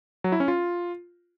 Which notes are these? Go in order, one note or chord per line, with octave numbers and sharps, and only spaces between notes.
F#3
E4
C#4
F4